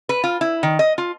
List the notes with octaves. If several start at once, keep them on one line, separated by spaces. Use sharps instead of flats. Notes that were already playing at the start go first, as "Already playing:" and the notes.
B4
F4
E4
D#3
D#5
F4